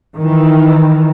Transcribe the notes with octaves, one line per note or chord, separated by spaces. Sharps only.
D#3 E3